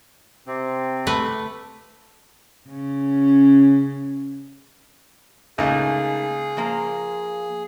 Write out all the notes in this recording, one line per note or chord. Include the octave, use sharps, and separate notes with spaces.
C3 C4
A3 B4
C#3 C#4
C#2 A3 A#3 D#4 G#4
F3 A#3 A#5